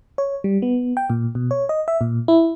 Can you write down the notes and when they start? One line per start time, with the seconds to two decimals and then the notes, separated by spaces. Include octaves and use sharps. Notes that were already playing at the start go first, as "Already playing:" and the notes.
0.18 C#5
0.44 G3
0.62 B3
0.97 G5
1.10 A#2
1.35 B2
1.51 C#5
1.69 D#5
1.88 E5
2.01 A#2
2.28 E4